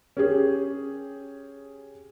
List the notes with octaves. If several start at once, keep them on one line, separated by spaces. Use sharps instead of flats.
C#4 G4 G#4